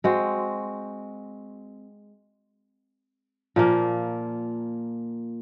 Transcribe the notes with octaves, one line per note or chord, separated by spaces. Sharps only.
G#3 C4 F#4 C5
A#2 F3 A#3